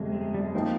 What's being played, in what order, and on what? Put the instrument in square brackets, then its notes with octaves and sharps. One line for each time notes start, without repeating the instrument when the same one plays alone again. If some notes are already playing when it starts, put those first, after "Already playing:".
Already playing: [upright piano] G1 F2 C3 [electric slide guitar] G#3
[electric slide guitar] G3
G#3
[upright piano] F3 C4 D#4 [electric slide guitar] A#3